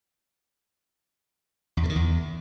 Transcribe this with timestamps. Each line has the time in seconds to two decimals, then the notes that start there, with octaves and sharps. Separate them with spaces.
1.77 E2
1.83 C#3
1.89 D#3
1.96 E2